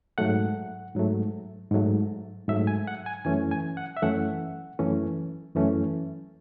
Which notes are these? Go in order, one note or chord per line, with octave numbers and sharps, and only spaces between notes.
G#2 F#3 A3 F#5
G#2 F#3 A3
G#2 F#3 A3
G#2 F#3 A3 E5
G#5
F#5
G#5
F#2 E3 A3 C#4 G#5
G#5
F#5
E5
F#2 E3 A3 C#4 F#5
F#2 E3 A3 C#4
F#2 E3 A3 C#4